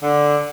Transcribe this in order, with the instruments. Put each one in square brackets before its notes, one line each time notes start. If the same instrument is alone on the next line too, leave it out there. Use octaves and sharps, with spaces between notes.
[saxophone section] D3